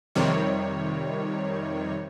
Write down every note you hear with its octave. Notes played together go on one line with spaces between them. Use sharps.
F2 C3 D#3 G3 C#5